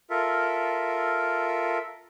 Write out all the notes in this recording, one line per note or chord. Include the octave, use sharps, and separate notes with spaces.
F4 A4 A#4 E5